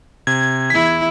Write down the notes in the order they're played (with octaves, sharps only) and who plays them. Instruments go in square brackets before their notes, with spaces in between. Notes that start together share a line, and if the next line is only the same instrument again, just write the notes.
[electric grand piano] C3 [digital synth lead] G#6
[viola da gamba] E2 E4 [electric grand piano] B6